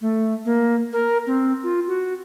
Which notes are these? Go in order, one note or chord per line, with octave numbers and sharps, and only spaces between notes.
A3
A#3
A#4
C4
F4
F#4